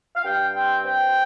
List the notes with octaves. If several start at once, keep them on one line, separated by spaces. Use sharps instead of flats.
F5
G2 G5
C4 G5
C4 G5